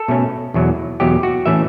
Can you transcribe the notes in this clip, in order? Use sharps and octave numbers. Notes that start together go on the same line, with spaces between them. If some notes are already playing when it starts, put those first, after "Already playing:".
Already playing: A4
B2 A3 C#4
E2 B2 F#3
E2 B2 F#3 G4
F#4
A2 E3 A3 C#4 E5